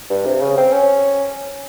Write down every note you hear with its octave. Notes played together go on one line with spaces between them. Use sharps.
G2
C3
C#3
C4
C#4